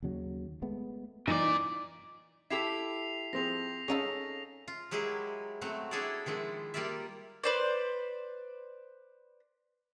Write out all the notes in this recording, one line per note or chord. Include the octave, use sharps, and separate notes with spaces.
D#2 C#3 F#3
G#3 A3 B3
A#2 E3 D#4 D5
E4 G4 A4 B6 C7 F7
F3 C4 G#4 A#6 F7
C#4 D#4 G#4 A4 F5
F4
F#3 G#3 E4 G4 G#4 A#4
F#3 A3 C4 F#4
D4 E4 G#4 A4 C#5 D5
D#3 F3 G#3 E4
G3 A#3 F4 A#4 D5 E5
B4 C5 D5